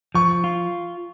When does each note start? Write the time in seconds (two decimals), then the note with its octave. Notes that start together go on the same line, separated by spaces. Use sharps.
0.15 F3 C#6
0.44 F4